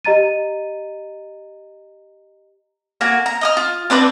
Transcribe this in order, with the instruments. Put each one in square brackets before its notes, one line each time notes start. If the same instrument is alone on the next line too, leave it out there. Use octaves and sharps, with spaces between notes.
[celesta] G4 D#5 A#5 A6 D#7
[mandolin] A#3 F#4 G#5
A#5
D#5 D#6 F6
F4
C4 D4 B4 D5